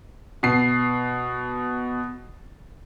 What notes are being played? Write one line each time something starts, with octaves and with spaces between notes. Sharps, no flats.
B2 C7